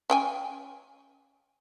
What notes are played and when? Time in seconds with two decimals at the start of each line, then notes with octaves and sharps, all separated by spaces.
0.10 C#4 G5 G#5